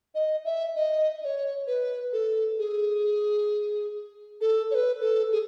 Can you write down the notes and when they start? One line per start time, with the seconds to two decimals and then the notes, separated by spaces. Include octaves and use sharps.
0.15 D#5
0.45 E5
0.76 D#5
1.22 D#5
1.25 C#5
1.67 B4
2.13 A4
2.59 G#4
4.41 A4
4.71 C#5
4.75 B4
5.01 A4
5.32 G#4